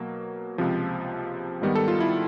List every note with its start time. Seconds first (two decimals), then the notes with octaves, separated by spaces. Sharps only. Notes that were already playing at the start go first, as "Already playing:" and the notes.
Already playing: B2 F#3 A#3
0.58 C#2 C3 F3
1.61 G#2 D#3 G3 B3
1.75 A4
1.88 F4
2.00 E4